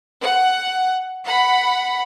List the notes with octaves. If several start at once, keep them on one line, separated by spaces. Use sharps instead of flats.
F#5
F#5 B5